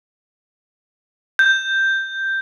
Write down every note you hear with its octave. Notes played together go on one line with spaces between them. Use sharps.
G6